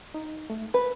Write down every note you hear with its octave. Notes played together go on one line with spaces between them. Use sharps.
D#4
A3
B4 B5